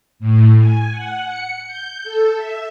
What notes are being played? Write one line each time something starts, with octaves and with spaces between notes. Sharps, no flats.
A2
G#5
F#5
C#7
G6
A4
E5